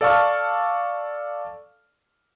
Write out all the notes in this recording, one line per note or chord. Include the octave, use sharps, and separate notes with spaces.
A4 D5 F5 A5 C#6 F6